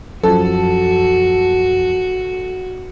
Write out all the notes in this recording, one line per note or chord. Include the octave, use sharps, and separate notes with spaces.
F#2 F3 F#4 A4